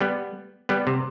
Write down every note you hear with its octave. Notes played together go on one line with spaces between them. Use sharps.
G3 B3
G3 B3
C3